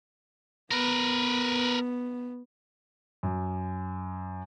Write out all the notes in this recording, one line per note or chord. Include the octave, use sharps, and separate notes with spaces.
B3 A#4 B4
F#2